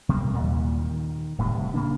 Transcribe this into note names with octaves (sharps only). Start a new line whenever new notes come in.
C3 G3 G#3 A#3
D#2 A#2 E3 G3
D#3
D1 A2 C3 G3
C#3 A#3 D4